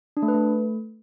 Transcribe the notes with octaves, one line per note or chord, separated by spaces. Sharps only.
D4
A3
B4
A3